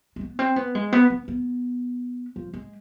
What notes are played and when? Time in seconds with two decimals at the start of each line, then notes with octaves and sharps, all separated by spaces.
0.16 G#3
0.21 B3
0.39 C4
0.56 B3
0.75 G#3
0.93 B3
1.10 B3
1.28 B3
2.36 F3
2.54 G#3